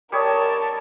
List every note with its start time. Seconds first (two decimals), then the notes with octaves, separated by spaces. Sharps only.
0.12 G3 A#4 C#5 D#5 A5